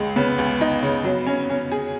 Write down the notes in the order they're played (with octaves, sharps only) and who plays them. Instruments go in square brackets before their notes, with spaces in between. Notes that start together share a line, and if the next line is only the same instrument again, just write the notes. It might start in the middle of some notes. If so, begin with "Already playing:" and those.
Already playing: [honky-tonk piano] C#2 G#3
[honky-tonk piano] C#3 [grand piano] B3
[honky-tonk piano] C#2
D#4
C#3
F#3
C#4
C#4
G#4